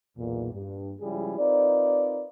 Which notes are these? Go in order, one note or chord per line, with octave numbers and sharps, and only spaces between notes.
B1 E2 A#2
G2
C#3 F3 G3 G#3 E4 G#4
C4 D#4 F4 A#4 B4 D5